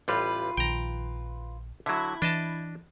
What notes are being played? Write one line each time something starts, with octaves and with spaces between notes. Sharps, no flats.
A1 G3 F4 B4
A#1 D#3 G5 A#5
D3 F#3 E4
E3 D4 D#5 A5